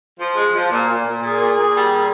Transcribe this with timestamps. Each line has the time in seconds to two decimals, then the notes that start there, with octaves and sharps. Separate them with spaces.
0.19 F3
0.35 G#3
0.53 F3
0.70 A#2
0.87 A#2
1.04 A#2
1.21 A#2 G#4
1.38 A#2
1.56 A#2
1.73 G3
1.91 A#2